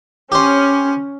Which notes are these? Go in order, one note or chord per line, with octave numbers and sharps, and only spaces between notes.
C#4 G4 C5